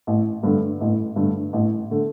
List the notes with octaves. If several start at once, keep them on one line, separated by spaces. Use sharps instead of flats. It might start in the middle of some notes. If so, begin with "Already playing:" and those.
A1
G2 D3 A3
A1
G2 D3 A3
A1
D3 A3